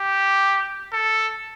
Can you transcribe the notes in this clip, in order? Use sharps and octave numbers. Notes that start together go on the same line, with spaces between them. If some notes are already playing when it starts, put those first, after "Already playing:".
Already playing: G4
A4